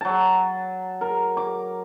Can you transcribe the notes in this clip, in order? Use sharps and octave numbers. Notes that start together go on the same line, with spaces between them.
F#3 A5
A#4
D6